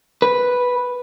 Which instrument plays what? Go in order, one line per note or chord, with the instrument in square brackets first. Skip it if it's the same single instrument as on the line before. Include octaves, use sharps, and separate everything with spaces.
[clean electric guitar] B4